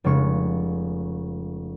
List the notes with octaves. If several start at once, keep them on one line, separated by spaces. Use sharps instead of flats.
F1 C#3 G#3 C#6